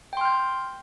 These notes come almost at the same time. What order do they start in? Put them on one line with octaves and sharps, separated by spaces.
G5 C6 F6 G6